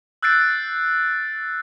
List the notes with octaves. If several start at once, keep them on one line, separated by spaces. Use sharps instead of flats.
E6 F#6 G6 A6 C7 D7